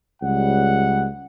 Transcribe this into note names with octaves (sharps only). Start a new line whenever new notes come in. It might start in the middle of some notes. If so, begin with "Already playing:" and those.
C#2 G3 F#5